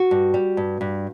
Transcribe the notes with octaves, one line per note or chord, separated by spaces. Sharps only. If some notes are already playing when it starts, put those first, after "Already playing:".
Already playing: F#4
G2
G3
G2
G2